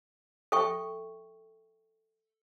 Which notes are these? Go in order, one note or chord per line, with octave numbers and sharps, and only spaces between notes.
A4 E5 G5 C#6